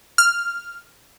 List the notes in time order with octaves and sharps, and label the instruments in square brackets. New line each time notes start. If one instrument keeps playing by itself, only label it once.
[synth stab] F6